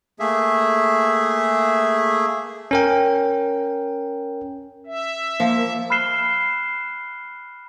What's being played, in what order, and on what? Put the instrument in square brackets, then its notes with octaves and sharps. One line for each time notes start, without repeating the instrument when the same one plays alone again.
[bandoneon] A3 A#3 G#4 E5
[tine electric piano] C#4 A#4 G5
[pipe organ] E5
[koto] F3 [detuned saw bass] A#3
[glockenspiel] B5 F6 F#6 C7 E7 G7